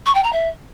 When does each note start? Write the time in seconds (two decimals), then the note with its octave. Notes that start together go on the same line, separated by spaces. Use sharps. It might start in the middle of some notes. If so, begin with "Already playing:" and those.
0.06 C#6
0.15 G5
0.24 A#5
0.32 E5